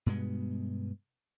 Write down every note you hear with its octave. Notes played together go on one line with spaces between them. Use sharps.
G2 B2 G#3 B3